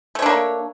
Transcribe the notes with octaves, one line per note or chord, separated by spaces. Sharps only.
A3 A#3 D4 C#5